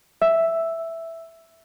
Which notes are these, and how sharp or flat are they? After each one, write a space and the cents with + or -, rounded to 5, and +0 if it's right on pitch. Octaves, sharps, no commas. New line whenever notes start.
E5 +0 E6 +0